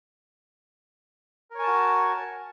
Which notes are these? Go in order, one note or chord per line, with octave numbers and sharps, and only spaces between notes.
F#4 A#4 C#5 G#5 A5